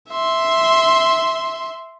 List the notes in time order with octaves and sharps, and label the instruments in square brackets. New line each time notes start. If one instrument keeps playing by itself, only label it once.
[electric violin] E5 C6